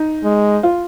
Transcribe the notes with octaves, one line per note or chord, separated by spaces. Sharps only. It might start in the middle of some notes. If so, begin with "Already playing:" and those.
Already playing: D#4
G#3
F4